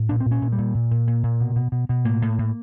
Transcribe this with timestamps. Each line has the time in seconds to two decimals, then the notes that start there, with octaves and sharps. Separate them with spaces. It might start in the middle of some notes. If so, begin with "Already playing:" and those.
Already playing: A2
0.09 A#2 D4
0.20 C4
0.26 A#2
0.31 C#4
0.42 A#2
0.52 G3
0.58 A#2
0.75 A#2
0.91 A#2
1.07 A#2
1.23 A#2
1.41 B2
1.56 B2
1.72 B2
1.89 B2
2.05 A2 A#3
2.22 A2
2.38 A2